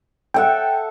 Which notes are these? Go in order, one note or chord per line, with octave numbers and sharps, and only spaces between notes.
A4 E5 F#5 G5